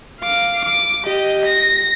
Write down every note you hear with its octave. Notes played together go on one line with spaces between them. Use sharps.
F5 D6
D6
G4 D#5
A#6